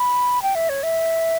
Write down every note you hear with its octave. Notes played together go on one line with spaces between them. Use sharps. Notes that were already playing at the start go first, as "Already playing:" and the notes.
Already playing: B5
G5
E5
C#5
E5